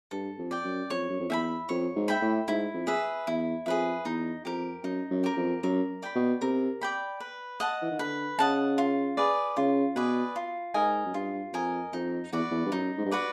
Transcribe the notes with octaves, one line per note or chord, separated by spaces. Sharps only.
G2 A4
F2
D5 G5
F#2
F2 C#5
F#2
F2
E2 E5 G5 B5
F2 C#5
G#2
E5 G5 B5
A2
G#2 E4
F2
G#4 B4 E5
E2 E4
F2 G#4 B4 E5
E2 D#4
F2 G4 A#4
F#2 D#4
F#2
G4 A#4
F2
F#2 A#4
D5 G5 B5
B2
C3 A#4
D5 G5 B5
B4
D#5 F#5 A5
E3
D#3
D3 B4
C#3 D#5 F#5 A5
F4
G#4 B4 D5
C#3 F4
B2 G#4 B4 D5
F4
G#2 A#4 D#5 G#5
F#2
G2 F4
F2 A#4 D#5 G#5
F2 D#4
E2 F#4 B4 D5
E2
G2
F#2 D#4
G#2
G2
F#4 B4 D5